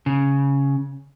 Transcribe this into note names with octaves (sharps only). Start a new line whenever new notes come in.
C#3